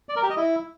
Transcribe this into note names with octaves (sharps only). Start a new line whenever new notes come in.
D5
A#4
G4
D#5
E4